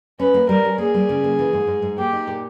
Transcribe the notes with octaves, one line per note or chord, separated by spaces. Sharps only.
C#4 B4
A#3
G3 A#4
C#4
A#3 G#4
G3
C#3
A#3
E3
G#2
G#2
G#2
A#3 G4
D#4
A#2